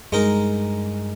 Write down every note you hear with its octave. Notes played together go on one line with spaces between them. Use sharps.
G2 G#3 D#4 A#4